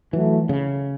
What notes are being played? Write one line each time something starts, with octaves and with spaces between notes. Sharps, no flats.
E3 F#3 A3 E4
C#3